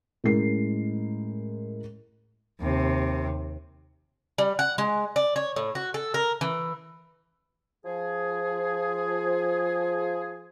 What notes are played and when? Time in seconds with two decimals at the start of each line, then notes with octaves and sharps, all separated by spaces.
0.24 A2 G#3 C#4 G#4 A#4 C7
2.61 D#2 C3
4.38 G3
4.59 F#5
4.78 G#3
5.16 D5
5.36 C#5
5.56 A2
5.75 F#4
5.94 A4
6.14 A#4
6.41 E3
7.85 F3 G#4